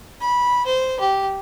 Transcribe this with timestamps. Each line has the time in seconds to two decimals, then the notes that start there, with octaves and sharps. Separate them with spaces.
0.21 B5
0.66 C5
1.00 G4